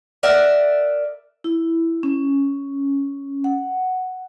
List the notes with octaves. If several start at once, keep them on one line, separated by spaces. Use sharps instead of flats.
A#4 D5 E5 F#5
E4
C#4
F#5